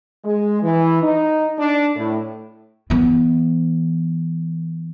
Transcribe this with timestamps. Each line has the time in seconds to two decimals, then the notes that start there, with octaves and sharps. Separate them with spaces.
0.25 G#3
0.63 E3
1.03 D#4
1.59 D4
1.96 A2
2.90 E3 B3